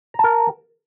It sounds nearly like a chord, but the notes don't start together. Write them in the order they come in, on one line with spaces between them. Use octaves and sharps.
A#5 A5 A#4